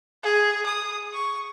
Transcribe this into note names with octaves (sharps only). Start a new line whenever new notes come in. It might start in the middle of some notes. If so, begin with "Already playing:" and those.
G#4
D#6
C#6